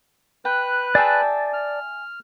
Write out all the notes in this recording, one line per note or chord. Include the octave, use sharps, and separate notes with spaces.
B4 G5 F#6
G#4 D5 E5 G5 A5
F6